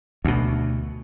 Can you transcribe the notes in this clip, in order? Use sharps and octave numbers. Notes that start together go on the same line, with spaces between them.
D2 B2